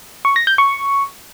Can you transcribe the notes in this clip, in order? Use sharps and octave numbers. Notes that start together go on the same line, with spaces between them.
C#6
A#6
G6
C#6